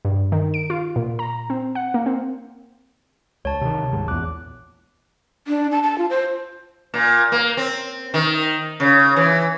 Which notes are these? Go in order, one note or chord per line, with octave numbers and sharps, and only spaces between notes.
G2
D#3
D7
F4
A#2
A#5
C4
F#5
A#3
C4
C#2 C#5 A5
C3 D#3
D#1 D#2 G#2
A#1 E2 D6 F#6
D4
A5
A5
F4
C5
A#2
A#3
C4
D#3
C#3
E3